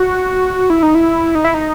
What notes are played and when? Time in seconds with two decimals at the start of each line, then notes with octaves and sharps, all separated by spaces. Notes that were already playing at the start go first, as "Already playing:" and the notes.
Already playing: F#4
0.70 E4
0.83 D#4
0.95 E4
1.35 D#4
1.45 E4
1.54 D#4